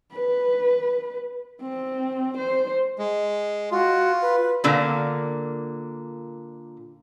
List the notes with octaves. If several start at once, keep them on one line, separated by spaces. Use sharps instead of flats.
B4
C4
C5
G#3
F4 F#4
B4
A#2 D3 A#3